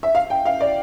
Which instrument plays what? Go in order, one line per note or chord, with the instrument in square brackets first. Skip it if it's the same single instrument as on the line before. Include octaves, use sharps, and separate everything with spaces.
[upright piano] E5
F5
G5
F5
D5